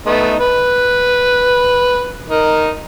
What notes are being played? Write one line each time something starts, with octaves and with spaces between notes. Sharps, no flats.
A3 B3 D#4
B4
D#4 A#4